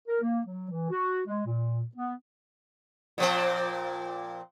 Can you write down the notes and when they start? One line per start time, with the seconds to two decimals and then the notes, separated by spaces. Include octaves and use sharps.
0.08 A#4
0.22 A#3
0.46 F#3
0.70 E3
0.90 F#4
1.27 G#3
1.46 A#2
1.96 B3
3.18 A#2 F3 C4